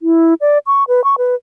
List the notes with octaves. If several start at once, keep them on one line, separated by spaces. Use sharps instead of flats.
E4
D5
C#6
B4
C#6
B4